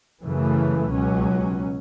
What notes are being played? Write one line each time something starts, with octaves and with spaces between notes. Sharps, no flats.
F#2 C#3 E3 A3
C#2 B2 F#3 C#4